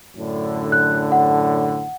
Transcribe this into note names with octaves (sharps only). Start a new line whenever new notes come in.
F#2 A2 D3
F#6
F#5